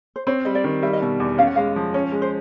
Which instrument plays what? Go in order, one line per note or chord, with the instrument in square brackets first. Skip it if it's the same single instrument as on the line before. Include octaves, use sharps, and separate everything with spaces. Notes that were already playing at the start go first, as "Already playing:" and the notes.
[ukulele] C5
[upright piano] C4 [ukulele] C#5
[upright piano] G3 [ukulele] D#5
[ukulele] D5
[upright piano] D#3
[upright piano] G3 [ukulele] E5
[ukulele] D#5
[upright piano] B2 [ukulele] E5
[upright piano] E2
[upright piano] C#4 [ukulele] F5
[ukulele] F#5
[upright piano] G#3 [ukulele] F5
[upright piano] F3
[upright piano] C#4 [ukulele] C#5
[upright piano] G#3
[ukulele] C5